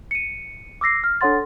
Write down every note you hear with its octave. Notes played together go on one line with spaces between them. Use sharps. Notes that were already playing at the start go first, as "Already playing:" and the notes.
C#7 D#7
D6 E6 A#6 C7
F6
D4 A4 C#5 F#5 C6 A6